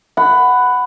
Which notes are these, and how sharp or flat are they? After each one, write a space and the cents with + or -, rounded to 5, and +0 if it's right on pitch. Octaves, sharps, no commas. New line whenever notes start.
F#5 +0 B5 +15